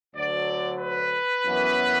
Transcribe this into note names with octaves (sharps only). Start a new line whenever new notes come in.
D2 D3 F#3 D5
B4
F#2 E3 B3